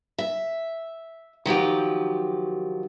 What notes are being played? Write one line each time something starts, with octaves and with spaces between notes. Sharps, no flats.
E5
D#3 F3 F#3 G4